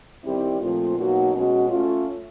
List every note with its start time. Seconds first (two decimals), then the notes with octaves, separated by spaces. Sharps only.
0.24 D#3 G3 C4 E4 G4
0.60 A#2 F3 A3 C4 F4
0.97 B2 F#3 A#3 D#4 F#4
1.33 B2 G#3 C#4 F#4
1.69 A3 C#4 F4